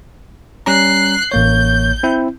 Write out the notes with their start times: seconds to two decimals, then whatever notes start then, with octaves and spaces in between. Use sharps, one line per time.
0.66 G3 C#4 A#5 F#6 C7
1.32 A1 A#3 C#5 G6
2.03 C4 E4